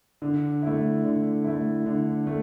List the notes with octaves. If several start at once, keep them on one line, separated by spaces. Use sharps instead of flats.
D3
A3 E4
D3
A3 E4
D3
A3